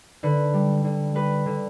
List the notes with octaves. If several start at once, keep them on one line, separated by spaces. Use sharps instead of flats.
D3 B4
G3
D3
G3 B4
D3